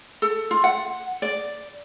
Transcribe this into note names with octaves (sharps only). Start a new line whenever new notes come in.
A4
F4
F#5
D5